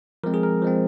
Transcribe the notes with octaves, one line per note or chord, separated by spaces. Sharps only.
F3 G#3 C4 A#4
G#4
A#4
F3 G#3 C4